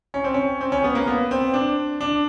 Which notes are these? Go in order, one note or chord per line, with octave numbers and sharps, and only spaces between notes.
C#4
C4
C#4
C4
C#4
B3
A#3
B3
C4
D4
D4